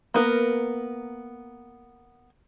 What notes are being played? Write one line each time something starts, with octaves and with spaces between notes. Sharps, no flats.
A#3 B3 A#4